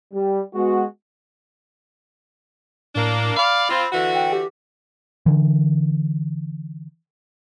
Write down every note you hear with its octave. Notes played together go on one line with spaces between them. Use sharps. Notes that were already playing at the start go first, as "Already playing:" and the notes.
G3
G#3 B3 F#4
A2 A#3 D4
D5 F5 B5
C4 F4
D3 E3 F#4
G5
G4
D3 E3